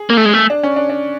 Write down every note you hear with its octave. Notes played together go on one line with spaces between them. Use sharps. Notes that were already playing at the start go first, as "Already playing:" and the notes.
Already playing: G#4
A#3
A3
G#3
A3
D4
C#4
D4
D4